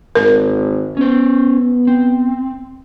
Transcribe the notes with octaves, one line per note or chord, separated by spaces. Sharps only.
G#1 A#4
B3 C#4 C5
C4